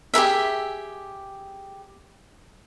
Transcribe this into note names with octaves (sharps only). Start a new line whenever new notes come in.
G4 G#4 A#4 E5